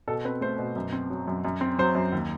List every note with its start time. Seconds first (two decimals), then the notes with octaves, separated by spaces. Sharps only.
0.08 B2 A4
0.25 C4 B4
0.41 A3 C5
0.59 B2
0.76 F#2
0.92 C4
1.10 F#3
1.28 F#2
1.45 F#2
1.61 C4
1.78 F#3 C5
1.95 F#2
2.12 D#2